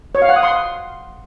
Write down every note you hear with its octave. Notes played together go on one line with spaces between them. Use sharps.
C#5
F5
F#5
D#6
C6